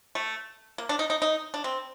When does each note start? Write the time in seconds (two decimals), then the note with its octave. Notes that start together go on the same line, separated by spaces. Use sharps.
0.15 A3
0.78 A#3
0.89 D4
0.99 D#4
1.10 D#4
1.22 D#4
1.54 D4
1.64 C4